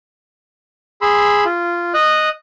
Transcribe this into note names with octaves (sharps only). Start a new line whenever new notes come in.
G#4 B5 C6 E6
F4
D#5 D#6 F#6